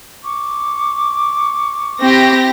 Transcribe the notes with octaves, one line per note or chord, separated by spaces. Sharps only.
C#6 D6
C4 E4 G4 A#6